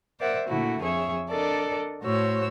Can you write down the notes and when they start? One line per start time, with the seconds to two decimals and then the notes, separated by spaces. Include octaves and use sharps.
0.20 A#4 C5 D5 E5 F#5
0.48 A#2 D3 A3 E4 F#4
0.81 F2 G#4 C#5 E5
1.30 D4 A4 A#4 D5 D#5
2.03 A2 F#4 C5 C#5 E6